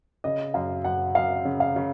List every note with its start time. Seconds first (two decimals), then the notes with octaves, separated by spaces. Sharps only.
0.24 C#3 D#5
0.54 F#2 F5
0.84 F#2 F#5
1.15 F#2 F5
1.45 C#3
1.60 F5
1.76 C#3